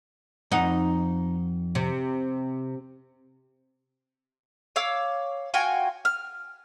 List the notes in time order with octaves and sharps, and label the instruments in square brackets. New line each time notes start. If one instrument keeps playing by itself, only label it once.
[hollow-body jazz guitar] F2 F#5 [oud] D#4
[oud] C3
[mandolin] C#5 F5 D6 E6
F4 F#4 G5 G#5
F6